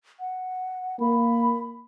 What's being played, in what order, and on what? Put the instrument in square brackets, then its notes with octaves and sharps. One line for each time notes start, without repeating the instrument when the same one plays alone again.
[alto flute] F#5
[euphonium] A#3 [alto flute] B5